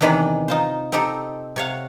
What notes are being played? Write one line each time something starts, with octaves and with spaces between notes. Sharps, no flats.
E2 C3 D#3 E3 D4 B5
D#4 F4 C5
C4 D#4 G4 A4
C3 C#5 F5 F#5